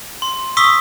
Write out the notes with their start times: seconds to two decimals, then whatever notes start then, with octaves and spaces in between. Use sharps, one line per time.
0.22 C6
0.57 C#6 D#6 E6 B6 G7